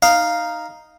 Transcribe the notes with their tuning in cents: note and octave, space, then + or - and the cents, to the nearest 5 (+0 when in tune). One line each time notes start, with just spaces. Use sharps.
D#4 +0 F5 +0